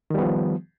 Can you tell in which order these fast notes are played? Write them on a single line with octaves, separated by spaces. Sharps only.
D#3 G3 B3 F3